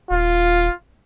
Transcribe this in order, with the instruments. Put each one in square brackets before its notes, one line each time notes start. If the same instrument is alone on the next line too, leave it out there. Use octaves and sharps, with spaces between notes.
[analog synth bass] D#1 [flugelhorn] F4